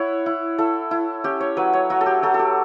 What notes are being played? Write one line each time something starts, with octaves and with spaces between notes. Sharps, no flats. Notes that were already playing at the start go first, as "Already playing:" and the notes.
Already playing: E4 C#5 F#5
E4
E4 A4
E4
C#4 G4
C#5
F#3 B4
C#5
F#3 F#4
A4
G4
F#3 A4
A4
G4